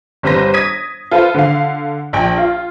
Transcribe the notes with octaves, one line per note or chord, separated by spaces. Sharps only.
G1 G3 C4 B4 C5 A#6
D#6 G#6 A#6 B6 D#7
F4 A4 B4 C5
D3 F5
A#1 G5
F4